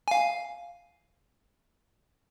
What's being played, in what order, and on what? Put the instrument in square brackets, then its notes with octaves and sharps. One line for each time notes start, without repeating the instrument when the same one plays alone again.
[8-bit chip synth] F5 G#5